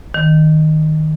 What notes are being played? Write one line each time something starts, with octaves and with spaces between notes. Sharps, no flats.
D#3